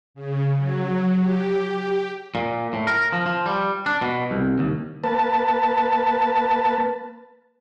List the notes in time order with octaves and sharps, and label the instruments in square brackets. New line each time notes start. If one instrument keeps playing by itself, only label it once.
[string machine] C#3
F#3
G4
[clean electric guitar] A#2
A2
A#4
F3
F3
G3
D4
B2
C2
D#2
[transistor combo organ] A#3 B4 A5